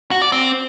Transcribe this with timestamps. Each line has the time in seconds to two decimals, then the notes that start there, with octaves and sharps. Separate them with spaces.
0.11 F#4
0.22 D5
0.32 C4